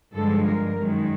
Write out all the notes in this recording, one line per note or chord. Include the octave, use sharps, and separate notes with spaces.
G2 D3 F3 G#3 A4
A#4
F#2 D#3 G#3